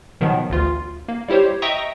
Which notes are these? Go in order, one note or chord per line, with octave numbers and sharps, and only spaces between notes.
B2 D#3 F3 F#3 B3
A1 D2 F4
A#3
G3 E4 G4 C5 C#5
D#5 E5 G5 A#5 C#6 D#6